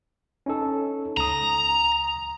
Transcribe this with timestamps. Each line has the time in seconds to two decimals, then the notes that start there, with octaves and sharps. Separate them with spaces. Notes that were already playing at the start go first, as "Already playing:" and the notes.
0.46 C#4 D#4 A4
1.17 C#2 A#5 D#6